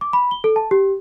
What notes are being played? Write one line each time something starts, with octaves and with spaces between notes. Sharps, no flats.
D6
B5
G7
A4
A5
G4